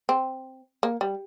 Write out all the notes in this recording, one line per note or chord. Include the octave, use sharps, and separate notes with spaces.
C4
A#3
G3